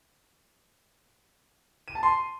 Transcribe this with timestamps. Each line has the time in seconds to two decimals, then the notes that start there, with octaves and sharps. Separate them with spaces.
1.88 D#7
1.95 A5
2.03 C6